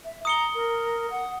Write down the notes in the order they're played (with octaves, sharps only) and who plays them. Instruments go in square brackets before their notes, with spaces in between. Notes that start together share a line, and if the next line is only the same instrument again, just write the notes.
[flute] E5
[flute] A#5 [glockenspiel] D#6 C#7 G7
[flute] A#4
F#5